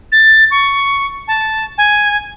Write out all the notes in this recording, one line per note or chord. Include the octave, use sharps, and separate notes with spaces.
A6
C#6
A5
G#5